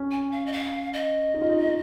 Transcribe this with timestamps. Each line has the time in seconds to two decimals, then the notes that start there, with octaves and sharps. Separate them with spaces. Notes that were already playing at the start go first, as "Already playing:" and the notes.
Already playing: C#4
0.11 G#5
0.32 F5
0.46 D#5
0.52 F5
0.93 D#5
1.34 D#4
1.41 F4
1.49 D#4
1.66 D#4